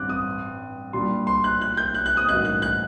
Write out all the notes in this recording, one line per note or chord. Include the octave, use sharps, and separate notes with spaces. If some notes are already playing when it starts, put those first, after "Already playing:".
Already playing: A1 G2 C4 D6 F#6
D#6
A#2 G3 D4 C6
C6
F#6
F#6
G6
F#6
F#6
D#6
A1 G2 F#3 A#3 D#4 F#6
F#6
F#6